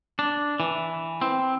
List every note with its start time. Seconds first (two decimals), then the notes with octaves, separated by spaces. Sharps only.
0.19 D4
0.60 E3
1.21 C4